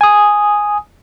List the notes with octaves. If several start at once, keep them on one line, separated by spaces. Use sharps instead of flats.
G#5 D#6